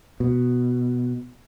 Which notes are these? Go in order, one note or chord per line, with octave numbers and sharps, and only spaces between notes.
B2